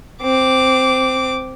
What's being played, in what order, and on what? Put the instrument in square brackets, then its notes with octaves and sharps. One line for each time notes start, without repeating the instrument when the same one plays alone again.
[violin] C4 D6